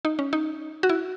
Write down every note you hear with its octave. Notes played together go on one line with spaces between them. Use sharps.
D#4
C#4
D#4
F#4
E4